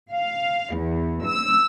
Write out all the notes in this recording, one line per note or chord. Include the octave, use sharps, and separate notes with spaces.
F5
E2
E6